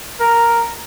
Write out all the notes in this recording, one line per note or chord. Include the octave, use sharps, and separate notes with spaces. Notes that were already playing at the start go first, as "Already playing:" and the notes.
A#4